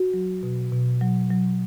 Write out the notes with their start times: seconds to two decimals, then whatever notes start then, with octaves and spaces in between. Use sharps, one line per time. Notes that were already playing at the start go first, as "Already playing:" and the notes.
Already playing: F#4
0.14 F#3
0.43 B2
0.72 B2
1.01 F#3
1.30 F#3